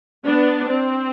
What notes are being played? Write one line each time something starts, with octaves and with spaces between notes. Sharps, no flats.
B3 D4
C4